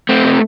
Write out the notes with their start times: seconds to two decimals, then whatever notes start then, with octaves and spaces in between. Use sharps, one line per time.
0.09 A3 C4
0.24 C3